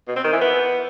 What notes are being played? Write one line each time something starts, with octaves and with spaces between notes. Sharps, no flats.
B2
C4
D#3
E3
B3